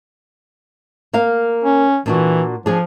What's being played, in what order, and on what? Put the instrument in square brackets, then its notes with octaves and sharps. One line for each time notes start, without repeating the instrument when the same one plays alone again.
[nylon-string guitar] A#3 A#4 F5
[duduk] C#4
[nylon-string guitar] A#2 D4 F#4 [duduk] E3
[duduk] F3 [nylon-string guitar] D4 G#4